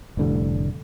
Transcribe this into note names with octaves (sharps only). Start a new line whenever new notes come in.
F1 A2 D3 G3